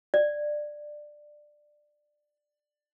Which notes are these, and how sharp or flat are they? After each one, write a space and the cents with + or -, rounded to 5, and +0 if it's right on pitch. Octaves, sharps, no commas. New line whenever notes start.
D5 +15